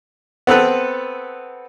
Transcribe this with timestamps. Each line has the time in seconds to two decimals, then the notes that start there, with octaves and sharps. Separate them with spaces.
0.47 B3 C4 A4 B4